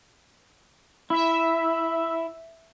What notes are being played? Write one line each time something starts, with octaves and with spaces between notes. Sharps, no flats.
E4 E5